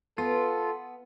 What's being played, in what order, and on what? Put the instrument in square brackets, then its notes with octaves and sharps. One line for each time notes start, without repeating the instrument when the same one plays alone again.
[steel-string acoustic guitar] B3 [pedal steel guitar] F4 [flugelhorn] A4